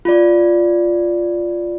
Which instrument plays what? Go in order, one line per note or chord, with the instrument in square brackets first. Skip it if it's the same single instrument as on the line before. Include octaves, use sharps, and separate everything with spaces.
[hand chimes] F4 D5